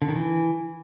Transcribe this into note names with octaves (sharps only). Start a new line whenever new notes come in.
D3
D#3
E3